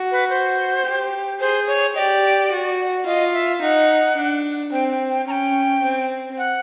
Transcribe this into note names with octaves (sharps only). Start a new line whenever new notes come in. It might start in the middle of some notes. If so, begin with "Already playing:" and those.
Already playing: F#4
B4
C5
G4
G#4 C5
C#5
G4 D5 D#5
F#4
F4 D#5
E5
D#4 F#5
D4
C4 G5
G5
G5
C#4 G5 A#5
C4
F#5